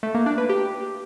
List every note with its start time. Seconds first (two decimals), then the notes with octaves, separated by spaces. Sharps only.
0.03 A3
0.15 A#3
0.26 D4
0.38 B4
0.49 G4